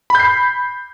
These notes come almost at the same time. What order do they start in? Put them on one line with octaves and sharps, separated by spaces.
B5 G6 C7